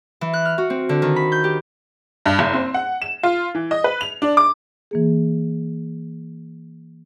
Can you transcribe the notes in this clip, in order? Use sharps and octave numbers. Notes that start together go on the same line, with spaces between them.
E3
F#6
F6
F#4
C4
D3
D#3
B5
G6
G4
G2
F#1
C4
F#5
E7
F4
E3
D#5
B4
F7
D4
D6
E3 A#3 G#4